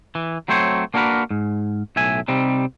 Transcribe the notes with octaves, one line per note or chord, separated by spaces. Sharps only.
E3
F#3 A3 C4 C5 C#5
A#3 D4 F#4 G4 A#4 B4
G#2
B1 A2 E5 G#5
C3 G3 C4 D#4